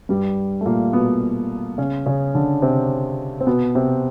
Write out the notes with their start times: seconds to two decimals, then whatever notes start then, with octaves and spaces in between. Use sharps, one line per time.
0.09 G2 G3
0.61 A3
0.66 A#2 A#3
0.93 B2 B3
1.78 C#3 C#4
2.06 C#3 C#4
2.34 D3 D4
2.62 C3 C4
3.41 C4
3.47 B2 B3
3.75 C3 C4